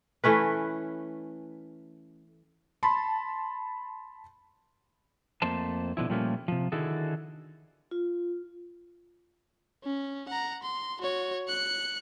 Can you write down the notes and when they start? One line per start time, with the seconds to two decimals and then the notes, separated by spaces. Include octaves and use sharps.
0.24 E3 A3 C#4 B4
2.83 A5 B5 C6
5.42 F2 A3 A#3 C5 A5
5.97 B2 D3 F3 E4
6.09 A#2 F3 G3 A3 A#3 C#4
6.48 C3 F3
6.72 D3 D#3 E4 F#4 G#4 A4
7.91 F4
9.83 C#4
10.28 F#5 A#5
10.63 C6
11.01 F#4 C#5
11.48 F#6 C#7